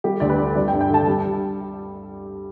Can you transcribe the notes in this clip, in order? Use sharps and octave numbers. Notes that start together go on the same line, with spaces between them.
G3 G4
D2 D5
B4
D3
G3 D5
G5
G2
G5
D3 A5
G3